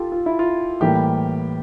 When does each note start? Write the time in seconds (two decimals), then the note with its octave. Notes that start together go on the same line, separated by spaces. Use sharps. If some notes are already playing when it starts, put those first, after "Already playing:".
Already playing: F4 G4 A4
0.12 F4
0.26 E4
0.39 F4
0.81 A2 E3 G3 A#3 G4